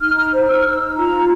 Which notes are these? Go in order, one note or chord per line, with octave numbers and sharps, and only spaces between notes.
D#4 F6
F6
C5
E6
F6
D#4 E6
F4 A#5